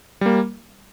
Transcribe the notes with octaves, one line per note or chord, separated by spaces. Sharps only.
G3 A#3